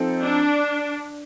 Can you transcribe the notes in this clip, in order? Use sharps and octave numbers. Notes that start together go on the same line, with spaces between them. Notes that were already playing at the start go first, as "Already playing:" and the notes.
Already playing: F3 C4 D#4 A4
D4